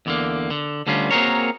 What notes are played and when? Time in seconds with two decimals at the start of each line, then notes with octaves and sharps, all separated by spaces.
0.06 E2 D3 A#3
0.51 D3
0.86 D2 D3 G3 C#4 F4
1.11 A#3 C4 F#4 G#4 A#4 C#5